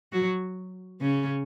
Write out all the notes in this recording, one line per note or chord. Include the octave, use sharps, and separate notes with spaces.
F#3 F#4
C#3 C#4